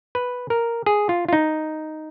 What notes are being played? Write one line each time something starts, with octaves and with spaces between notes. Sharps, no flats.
B4
A#4
G#4
F4
F4
D#4